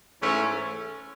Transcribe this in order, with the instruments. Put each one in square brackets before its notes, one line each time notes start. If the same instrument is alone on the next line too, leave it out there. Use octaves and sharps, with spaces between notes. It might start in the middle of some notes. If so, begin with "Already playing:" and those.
[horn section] G#2 E3 A3 C#4